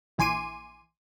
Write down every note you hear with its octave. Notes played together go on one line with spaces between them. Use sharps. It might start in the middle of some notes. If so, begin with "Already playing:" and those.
A#1 E3 G#5 C6 D6 D#7